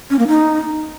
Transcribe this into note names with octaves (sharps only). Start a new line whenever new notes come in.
C#4
A#3
D#4